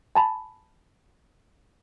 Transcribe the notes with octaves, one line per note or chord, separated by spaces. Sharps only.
G#5 A5 B5